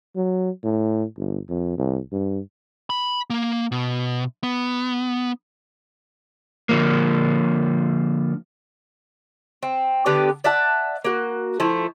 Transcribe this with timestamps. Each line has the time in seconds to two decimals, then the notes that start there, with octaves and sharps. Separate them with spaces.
0.16 F#3
0.64 A2
1.17 G1
1.49 F2
1.78 C2
2.12 G2
2.90 B5
3.30 A#3
3.72 B2
4.43 B3
6.69 D3 F3 A#3
9.63 C4
10.06 D3 B3 G4 D5
10.44 D5 E5 F#5 A5
11.04 A#3 F#4
11.60 F3 A3 E4